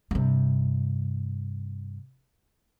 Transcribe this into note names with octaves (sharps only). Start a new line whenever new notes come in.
G2 C3